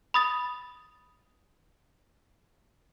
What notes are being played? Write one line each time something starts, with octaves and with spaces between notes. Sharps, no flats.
B5 D#6 A6